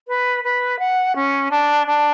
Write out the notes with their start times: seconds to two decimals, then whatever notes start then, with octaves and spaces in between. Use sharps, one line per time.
0.08 B4
0.44 B4
0.79 F#5
1.15 C#4
1.51 D4
1.87 D4